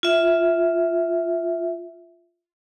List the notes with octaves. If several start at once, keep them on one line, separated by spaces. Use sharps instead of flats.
F4 E5